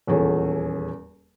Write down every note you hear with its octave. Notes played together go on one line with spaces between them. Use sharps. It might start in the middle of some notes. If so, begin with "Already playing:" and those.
D#1 E2 F3 C#4 G#4 A4